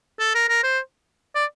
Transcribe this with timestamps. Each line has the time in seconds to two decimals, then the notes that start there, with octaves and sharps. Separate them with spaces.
0.20 A4
0.35 A#4
0.49 A#4
0.64 C5
1.35 D5